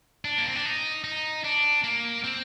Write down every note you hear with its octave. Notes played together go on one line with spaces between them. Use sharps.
D4
A#3
C4
D4
D#4
D#4
D4
A#3
C4